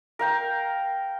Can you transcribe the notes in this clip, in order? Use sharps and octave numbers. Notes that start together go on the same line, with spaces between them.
A#4 F5 G5